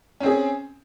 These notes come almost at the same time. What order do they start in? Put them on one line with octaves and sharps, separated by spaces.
C#4 C4 G#4